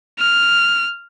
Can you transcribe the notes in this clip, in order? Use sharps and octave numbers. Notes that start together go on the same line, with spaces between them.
F6